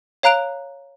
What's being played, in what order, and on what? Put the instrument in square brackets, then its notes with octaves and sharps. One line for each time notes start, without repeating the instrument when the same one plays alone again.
[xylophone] C#5 F5 A#5 F#6 D7 F7